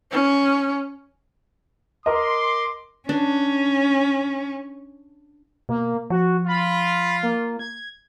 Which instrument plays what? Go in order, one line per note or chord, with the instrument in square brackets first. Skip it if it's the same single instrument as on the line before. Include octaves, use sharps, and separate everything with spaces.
[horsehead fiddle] C#4
[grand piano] A#4 D#5 [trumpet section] C6 D6
[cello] C#4 [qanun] D4
[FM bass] B2 [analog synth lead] A#3
[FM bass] F3 [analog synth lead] F#4
[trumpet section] F4 [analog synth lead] B5
[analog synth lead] A#3
G#6